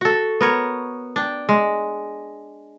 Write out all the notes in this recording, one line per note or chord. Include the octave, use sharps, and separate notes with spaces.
F#4 A4
B3 A#4 C#5
D4 G5
G#3